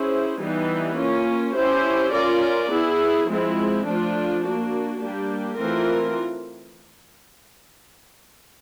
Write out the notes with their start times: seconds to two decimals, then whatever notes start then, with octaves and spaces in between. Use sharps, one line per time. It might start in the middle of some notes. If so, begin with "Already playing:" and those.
Already playing: C#4 E4 G#4 C5
0.41 E3 G3 B3 D#4
0.98 A#3 C#4 F4
1.56 C#4 E4 G4 C5
2.13 C#4 F4 A#4 D5
2.71 B3 E4 G#4
3.28 F3 G#3 C4 E4
3.86 F3 A3 D4 F4
4.43 A#3 D4 F#4
5.00 G3 A#3 D4 G4
5.58 E3 A3 C4 F4 A#4